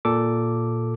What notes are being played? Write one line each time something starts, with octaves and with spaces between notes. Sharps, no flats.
A#2 A4 D6